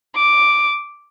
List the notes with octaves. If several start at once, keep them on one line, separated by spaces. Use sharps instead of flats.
D6